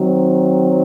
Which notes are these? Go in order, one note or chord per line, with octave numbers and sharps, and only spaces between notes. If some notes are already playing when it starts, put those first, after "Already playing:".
Already playing: D#3 F#3 C4